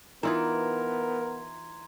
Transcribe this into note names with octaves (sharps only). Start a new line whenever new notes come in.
E3 B3 D#4 F4 A#4 A#5 C6 G#6